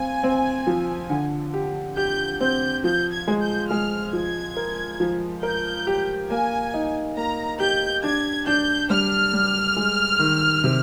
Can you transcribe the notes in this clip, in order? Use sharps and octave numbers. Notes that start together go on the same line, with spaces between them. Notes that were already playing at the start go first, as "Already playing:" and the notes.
Already playing: C4 F4 G#5
C4
F3
D3
G4
G4 G6
C4 G6
F3 G6
G#6
G#3
G6
G#3 F6
F3 G#6
A#4
F3
A#4 G6
G4
A#3 G#5
D#4
A#3 A#5
G4 G6
D4 G#6
D4 G6
G3 F6
G3
G#3
D#3
C3